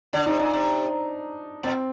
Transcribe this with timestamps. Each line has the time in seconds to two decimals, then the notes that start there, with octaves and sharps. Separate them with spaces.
0.13 D3 D4
0.26 C3 D#4
0.39 A#2 D4
0.53 C3
1.63 A#2 C4